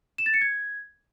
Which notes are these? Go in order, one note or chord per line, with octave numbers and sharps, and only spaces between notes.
E7
A6
C#7
G#6